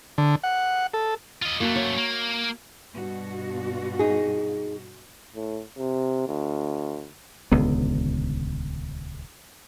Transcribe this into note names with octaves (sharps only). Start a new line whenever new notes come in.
D3
F#5
A4
F4 D#5
F#2 A3 A#3 F#4
C#5
A#3
G2 B2 F#4
D#4 G#4
A2
C3
D2
D#1 C#2 D3 B3